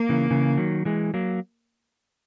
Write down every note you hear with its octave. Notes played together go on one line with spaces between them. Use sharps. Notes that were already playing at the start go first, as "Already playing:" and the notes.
Already playing: A#3
C#3 E3
C#3 E3
D#3 F#3
E3 G#3
F#3 A#3